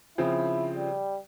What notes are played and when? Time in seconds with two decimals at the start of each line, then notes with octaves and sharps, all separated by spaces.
0.18 C#3 F3 C4 E4
0.75 G3